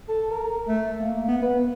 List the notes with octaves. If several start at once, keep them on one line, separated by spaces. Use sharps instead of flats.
A4
A#4
A3
A#3
B3
B4